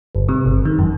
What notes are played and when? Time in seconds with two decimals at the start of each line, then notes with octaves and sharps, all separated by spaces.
0.15 G1
0.29 C3
0.46 G1
0.65 D#3
0.79 F#2